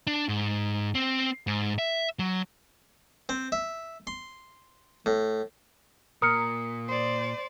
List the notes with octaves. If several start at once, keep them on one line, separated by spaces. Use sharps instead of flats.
D4
G#2
C4
G#2
E5
F#3
C4
E5
C6
A2
A#2 A#4 D#6 C#7
C5 D5